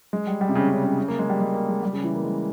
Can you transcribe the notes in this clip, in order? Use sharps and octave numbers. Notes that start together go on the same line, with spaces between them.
G#3
G3
G3
C3
C#3
C#3
C#3
C#3
A#3
G#3
G3
G#3
A#3
G#3
G3
C#3
E3
A#3
G#3